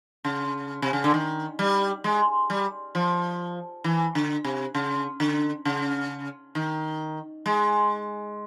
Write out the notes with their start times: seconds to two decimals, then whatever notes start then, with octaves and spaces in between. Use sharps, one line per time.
0.25 C#3
0.82 C3
0.93 C#3
1.04 D3
1.14 D#3
1.59 G3
2.04 G#3
2.50 G3
2.95 F3
3.84 E3
4.15 D3
4.44 C3
4.75 C#3
5.20 D3
5.65 C#3
6.55 D#3
7.46 G#3